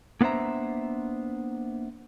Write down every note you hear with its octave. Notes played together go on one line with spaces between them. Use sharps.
A#3 B3 D4 C5 E5 A#5